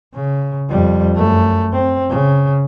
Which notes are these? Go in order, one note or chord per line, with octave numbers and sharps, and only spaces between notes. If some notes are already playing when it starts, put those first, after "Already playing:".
C#3
F2 G3
F#2 A3
C4
C#3